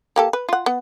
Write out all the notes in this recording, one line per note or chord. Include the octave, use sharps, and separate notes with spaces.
A#3 G4 A4
B4
F4 F#5
B3